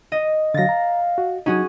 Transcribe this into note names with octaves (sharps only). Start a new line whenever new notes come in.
D#5
D3 F#3 F5 A6 A#6
A#5
F#4
F#3 C#4 D#4 F#4 G#4